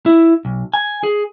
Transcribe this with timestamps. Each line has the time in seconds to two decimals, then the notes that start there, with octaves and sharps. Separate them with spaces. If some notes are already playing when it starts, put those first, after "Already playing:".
0.06 E4
0.45 B1
0.74 G#5
1.03 G#4